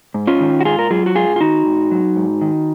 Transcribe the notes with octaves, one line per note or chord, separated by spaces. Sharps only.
G#2
C#4 F4
D#3
F#4
G#2 F4 G#4
A#4
F#3 F4 G#4
F#4
G#2 F4 G#4
F4
D#3 D#4 F#4
G#2
F#3
G#2
D#3